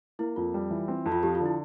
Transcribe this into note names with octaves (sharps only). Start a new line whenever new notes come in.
A#3 E4
F2 F4
G3
E3
C4
F2
F4
F3 G4
D3 F4
E4